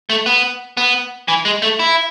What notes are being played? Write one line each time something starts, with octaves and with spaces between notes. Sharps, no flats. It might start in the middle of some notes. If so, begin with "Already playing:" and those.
A3
B3
B3
E3
G#3
A3
E4